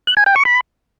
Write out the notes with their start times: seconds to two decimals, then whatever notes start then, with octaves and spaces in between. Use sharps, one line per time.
0.07 F#6
0.17 G#5
0.26 G5
0.36 C#6
0.45 B5